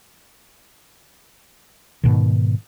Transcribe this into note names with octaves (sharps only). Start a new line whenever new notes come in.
G#2 B2 D#3